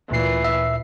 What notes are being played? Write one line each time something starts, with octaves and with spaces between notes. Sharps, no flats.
D2 A#2 E3 C7
E5